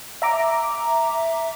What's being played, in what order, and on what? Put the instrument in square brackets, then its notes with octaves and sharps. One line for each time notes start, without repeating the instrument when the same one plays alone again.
[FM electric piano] E5 A#5 D6